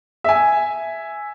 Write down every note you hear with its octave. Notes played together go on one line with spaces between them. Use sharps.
E5 G#5